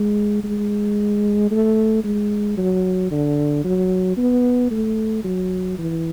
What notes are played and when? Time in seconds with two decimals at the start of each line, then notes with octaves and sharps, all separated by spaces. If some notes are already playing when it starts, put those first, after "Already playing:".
Already playing: G#3
0.44 G#3
1.51 A3
2.04 G#3
2.57 F#3
3.11 D3
3.64 F#3
4.17 B3
4.71 A3
5.24 F#3
5.78 E3